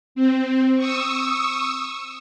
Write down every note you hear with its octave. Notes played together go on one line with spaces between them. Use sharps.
C4
C#6 D#6 E6